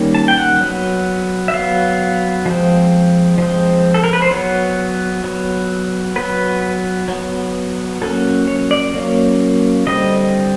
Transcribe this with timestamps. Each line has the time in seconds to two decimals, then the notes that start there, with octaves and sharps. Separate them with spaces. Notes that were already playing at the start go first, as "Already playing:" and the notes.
Already playing: D#3 G3 A#3 C#4
0.15 A5
0.28 G5
0.38 F#5
0.60 F#3 B3
1.48 E5
1.53 F#3 B3 F5
2.46 F3 G#3 C4
3.38 F3 G#3 C4
3.94 A4
4.04 A#4
4.13 B4
4.22 C5
4.31 F#3 B3 C#5
5.24 F#3 B3
6.16 F#3 B3 B4
7.08 F#3 B3
8.01 F#3 A#3 C#4 A4
8.47 C#5
8.71 D5
8.94 F#3 A#3 C#4
9.87 D3 G3 C4 D#5